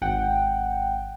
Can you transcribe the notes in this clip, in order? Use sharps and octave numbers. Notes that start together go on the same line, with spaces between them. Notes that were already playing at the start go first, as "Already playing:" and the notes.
G#1 F#5 G5